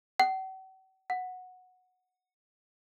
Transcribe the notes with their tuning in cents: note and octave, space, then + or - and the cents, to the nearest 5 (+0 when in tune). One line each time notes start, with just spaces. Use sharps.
F#5 +45
F#5 -10